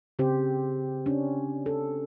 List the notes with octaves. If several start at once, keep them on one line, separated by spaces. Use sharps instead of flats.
C#3 C4 G4 C5
C#4 D4
A4